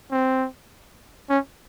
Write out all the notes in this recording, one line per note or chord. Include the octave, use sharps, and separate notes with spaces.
C4
C#4